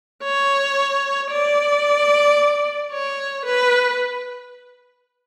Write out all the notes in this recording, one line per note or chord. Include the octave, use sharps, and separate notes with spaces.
C#5
D5
C#5
B4